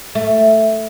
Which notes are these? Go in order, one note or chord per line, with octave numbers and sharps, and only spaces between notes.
A3